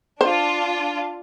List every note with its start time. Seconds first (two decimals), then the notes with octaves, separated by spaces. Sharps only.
0.21 D4 F4 C5